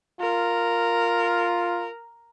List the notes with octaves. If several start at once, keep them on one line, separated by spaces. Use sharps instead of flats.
F4 A#4